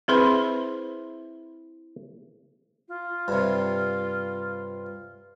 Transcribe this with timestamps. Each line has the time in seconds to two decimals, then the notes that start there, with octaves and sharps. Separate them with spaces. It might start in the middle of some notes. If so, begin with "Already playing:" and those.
0.08 C4 E4 G#4 B4 C5
2.88 F4
3.28 G2 C3